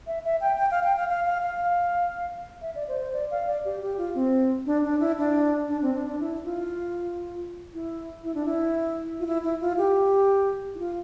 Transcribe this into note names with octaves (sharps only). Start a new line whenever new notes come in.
E5
E5
G5
G5
F5
G5
F5
F5
F5
F5
E5
D5
C5
C5
D5
F5
D5
G4
G4
F4
C4
D4
D4
E4
D4
D4
C4
D4
D4
E4
F4
E4
E4
D4
E4
F4
E4
E4
F4
G4
E4
F4